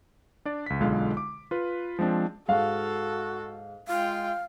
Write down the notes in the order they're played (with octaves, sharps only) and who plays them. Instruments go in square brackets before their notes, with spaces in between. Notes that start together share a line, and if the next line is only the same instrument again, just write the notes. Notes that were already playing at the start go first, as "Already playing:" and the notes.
[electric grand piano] D4 D5
C#2 B6
B1 D3 G#3 F4 F5
D6
F4 B4
F3 G#3 C4 D4
[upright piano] G#2 F5 [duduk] F#4 [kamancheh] A4
[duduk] G#3 [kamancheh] F4 G5 [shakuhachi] F5